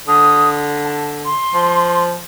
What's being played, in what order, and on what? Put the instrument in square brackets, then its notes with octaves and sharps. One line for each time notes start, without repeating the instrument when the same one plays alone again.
[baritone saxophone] D3 [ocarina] D#6
[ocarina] A5
C6
[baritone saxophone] F3